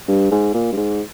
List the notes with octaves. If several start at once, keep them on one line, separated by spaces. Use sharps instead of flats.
G2
G#2
A#2
G2
G#2